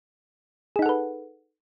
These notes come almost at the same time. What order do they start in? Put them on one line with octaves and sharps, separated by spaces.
G#4 D#4 F#5 A4 B4